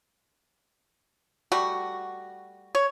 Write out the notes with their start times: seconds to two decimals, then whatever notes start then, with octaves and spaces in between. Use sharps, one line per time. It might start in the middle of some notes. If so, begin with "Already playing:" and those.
1.52 G3 A3 F#4
2.75 C#5